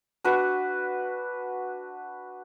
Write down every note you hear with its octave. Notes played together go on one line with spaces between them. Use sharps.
D4 F#4 B4